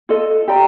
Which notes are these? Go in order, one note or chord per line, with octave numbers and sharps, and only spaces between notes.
F4 A4 D#5
G4 D5 G5 A#5